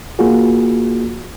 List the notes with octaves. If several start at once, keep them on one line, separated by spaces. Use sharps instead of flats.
A#3 F4 F#4 G#4